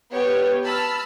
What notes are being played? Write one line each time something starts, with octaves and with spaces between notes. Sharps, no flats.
B3 G4 C#5
A5 B5 E6 F6